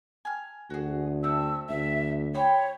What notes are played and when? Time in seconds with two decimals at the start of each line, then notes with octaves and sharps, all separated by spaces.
0.25 G#5 F6
0.70 D2 F#4 G#4
1.24 A3 C4 E6
1.69 D2 E5
2.34 C5 C#5 G5 B5